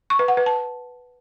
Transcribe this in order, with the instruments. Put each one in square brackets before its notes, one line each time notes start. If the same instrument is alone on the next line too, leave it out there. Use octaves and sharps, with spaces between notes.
[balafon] C#6
B4
F#5
B4
A5